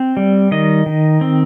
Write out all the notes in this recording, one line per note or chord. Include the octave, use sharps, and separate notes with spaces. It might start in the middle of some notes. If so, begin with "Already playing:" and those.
Already playing: C4
G3
D#3 D#5
D#3
C4